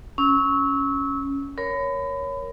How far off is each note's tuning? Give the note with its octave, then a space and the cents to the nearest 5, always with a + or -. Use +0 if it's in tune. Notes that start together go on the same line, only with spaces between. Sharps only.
C#4 +0 E6 -25
A#4 +10 C#5 +0 B5 +30